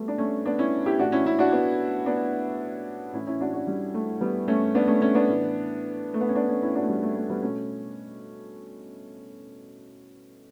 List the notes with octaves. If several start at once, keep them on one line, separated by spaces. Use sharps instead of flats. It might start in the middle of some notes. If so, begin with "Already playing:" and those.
Already playing: B2 G3 A3 B3
D4
A3 C#4
B3 D4
C#4 E4
E4 G4
A2 E3 D4 F#4
C#4 E4
C#4 E4
D4 F#4
B3 D4
B3 D4
A2 E3 C#4 E4
C#4 E4
D4 F#4
D4 F#4
G3
A3
G3 B3
A3 C#4
B3 D4
A3 C#4
A3 C#4
B3 D4
A2 E3
A3
B3
C#4
B3 D4
A3 C#4
C#4 E4
D4 F#4
A3
G3
A3
A3
G3 B3
B2 A3 C#4